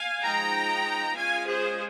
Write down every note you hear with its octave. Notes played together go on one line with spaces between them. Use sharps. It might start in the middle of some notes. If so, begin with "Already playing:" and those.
Already playing: F5 G#5
F3 G#3 D#4 G5 A#5
G#3 C#4 F4 F5 G#5
G#4 C5